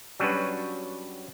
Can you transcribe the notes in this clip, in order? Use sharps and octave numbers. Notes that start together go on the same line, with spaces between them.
F#3 G3 C#4 D4 F#4 B4